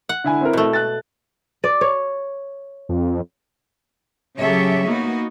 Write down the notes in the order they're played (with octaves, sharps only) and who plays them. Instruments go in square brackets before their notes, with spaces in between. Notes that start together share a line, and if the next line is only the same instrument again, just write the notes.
[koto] F#5
[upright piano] D3 E4 G#5
C4 E4 A#4
[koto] B2 A3
[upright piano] F#6 A6
[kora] D5
C#5
[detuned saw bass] F2
[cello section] C#3 F#3 G4 A4 C#5 E5
A#3 B3 D#4 F#4